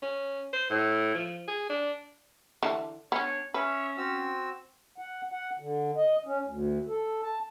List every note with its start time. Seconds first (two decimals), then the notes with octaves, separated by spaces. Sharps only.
0.02 C#4
0.53 C5
0.70 A2
1.15 F3
1.48 G#4
1.70 D4
2.63 D3 E3 D4
3.12 B3 C#4 D4 C#5
3.54 C#4 B4 C#5 E5
3.97 C4 F#4 E6
4.98 F#5
5.32 F#5
5.59 D3
5.96 D#5
6.26 C#4
6.46 D2
6.87 A4
7.22 A5